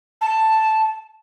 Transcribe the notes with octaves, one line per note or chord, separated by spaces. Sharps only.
A5